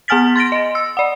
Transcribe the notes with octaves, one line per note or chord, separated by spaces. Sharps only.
B3 F#5 G#5 F6 A6 B6
C6 A6 A#6 D7
D#5
E6
D5 F#5